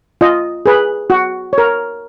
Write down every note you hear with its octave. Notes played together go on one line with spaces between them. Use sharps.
F4 D#5
G#4 B4
F#4
A#4 C#5